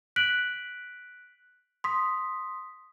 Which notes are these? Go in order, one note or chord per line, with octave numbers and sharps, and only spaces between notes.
F#6 B6 D7 F#7
C6 D#6 B6